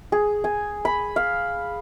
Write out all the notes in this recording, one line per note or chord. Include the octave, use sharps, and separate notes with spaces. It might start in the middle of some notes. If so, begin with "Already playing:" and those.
G#4
G#5
B5
F5